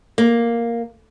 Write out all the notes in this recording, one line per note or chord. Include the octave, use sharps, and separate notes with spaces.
A#3